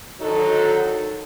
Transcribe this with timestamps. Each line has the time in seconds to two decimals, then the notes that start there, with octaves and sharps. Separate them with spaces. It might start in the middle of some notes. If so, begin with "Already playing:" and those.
0.21 D3 D#3 F#3 D#4 F#4 A4